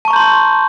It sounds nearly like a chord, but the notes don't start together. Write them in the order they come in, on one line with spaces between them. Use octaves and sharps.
A5 C#6 A#5 G6 C6